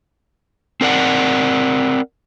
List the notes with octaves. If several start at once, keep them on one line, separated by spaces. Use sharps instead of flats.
C4 A#4 D5 F#5